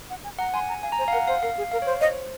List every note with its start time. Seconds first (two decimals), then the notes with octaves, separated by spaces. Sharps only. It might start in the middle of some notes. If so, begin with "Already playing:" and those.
0.10 F#5
0.24 G#5
0.39 F#5 A#5
0.54 G#5 C6
0.69 A#5
0.83 F5 G#5
0.92 A#5
0.98 C5
1.01 G#5
1.08 F5
1.13 A#4 F#5
1.27 C5 F5
1.42 A#4 F5
1.58 G#4
1.72 A#4 F5
1.82 C#5
1.86 C5
2.01 C5 D#5